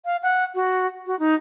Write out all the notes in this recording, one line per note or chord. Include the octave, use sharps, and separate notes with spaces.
F5
F#5
F#4
F#4
D#4